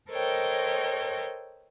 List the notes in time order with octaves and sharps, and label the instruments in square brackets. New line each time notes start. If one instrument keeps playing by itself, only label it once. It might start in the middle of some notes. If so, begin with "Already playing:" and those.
[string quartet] A4 A#4 C5 C#5 D#5 G5